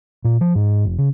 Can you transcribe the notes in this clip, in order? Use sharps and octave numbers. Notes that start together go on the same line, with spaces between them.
A#2
F3
G#2
F1
C#3